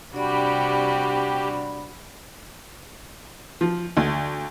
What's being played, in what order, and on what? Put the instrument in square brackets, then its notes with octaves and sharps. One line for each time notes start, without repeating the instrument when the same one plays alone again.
[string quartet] C3 G3 F#4 [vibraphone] D4 D5 B5 [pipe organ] G4
[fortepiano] F3
D2